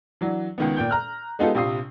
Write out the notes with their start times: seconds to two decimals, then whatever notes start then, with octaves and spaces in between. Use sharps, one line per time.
0.21 E3 F#3 D4
0.58 C#2 D#3 B3
0.77 A#2 G5 G6
0.90 A#5 F6 F#6
1.39 G#3 B3 D#4 F4 G4 A4
1.55 A#1 C3 F4 D#6 C7